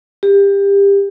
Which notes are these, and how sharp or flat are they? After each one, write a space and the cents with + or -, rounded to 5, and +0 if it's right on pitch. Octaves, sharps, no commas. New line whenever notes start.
G4 +25